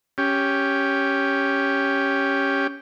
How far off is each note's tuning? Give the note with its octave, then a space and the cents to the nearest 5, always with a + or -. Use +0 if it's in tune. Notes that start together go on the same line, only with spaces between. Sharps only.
C#4 +0 G4 +0